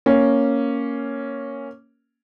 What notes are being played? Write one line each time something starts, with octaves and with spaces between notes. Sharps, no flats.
A#3 C#4